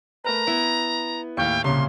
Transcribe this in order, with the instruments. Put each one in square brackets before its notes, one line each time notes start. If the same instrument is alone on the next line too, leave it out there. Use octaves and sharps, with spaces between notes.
[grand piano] A3 A#4 B4 [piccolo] A#5
[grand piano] B3 [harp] E4
[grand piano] D#2 A2 [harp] F5 C#6 [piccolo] G5
[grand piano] C2 A#2 [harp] C#3 [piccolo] C6